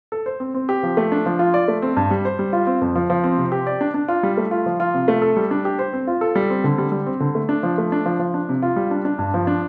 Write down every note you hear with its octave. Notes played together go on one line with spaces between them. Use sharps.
A4
C5
C4
C4
G4
F3
A3
D4
F3
F4
D5
A3
C4
G2
G3
C5
G3
F4
C4
F2
F3
F3
C4
C3
G4
D5
D4
D4
F4
G3
A3
F4
F3
F4
C3
A3
A4
G3
D4
G4
C5
C4
F4
A4
G3
C4
D3
G3
G3
C4
D3
A3
D4
F3
A3
D4
F3
F3
D4
C3
F4
G3
D4
D4
G2
F3
D4